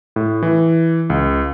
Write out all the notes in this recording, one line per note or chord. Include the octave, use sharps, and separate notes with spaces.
A2
E3
C#2